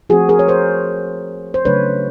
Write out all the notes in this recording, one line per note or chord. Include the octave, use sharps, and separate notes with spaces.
F3 A3 C4 F#4 G#4
G#4 A#4
C#5
A#4 C5
C5
C#3 F#3 A3 D4 B4 C#5